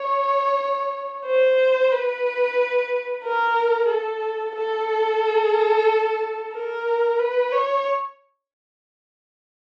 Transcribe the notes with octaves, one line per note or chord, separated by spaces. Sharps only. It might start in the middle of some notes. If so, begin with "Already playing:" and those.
Already playing: C#5
C5
B4
A#4
A4
A4
A#4
B4
C#5